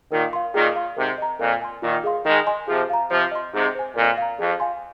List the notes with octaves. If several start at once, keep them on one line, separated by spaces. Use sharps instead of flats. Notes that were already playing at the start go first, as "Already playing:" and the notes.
A#2 D#3 A#4
F5 C6
A#2 D#3 G#4
F5 C6
G#2 C3 A#4
D#5 A#5
F2 A#2 A#4
G#5 C6
A#2 D#3 F4
G#4 F5 C6
D#3 G#3 A#4
D#5 G#5 C6
C3 F3 G#4
F5 A#5
C3 F3 C5
D#5 C6
G#2 C3 G#4
C5 G#5
F2 A#2 A#4
F5 A#5
F2 G#4
F5 G#5 C6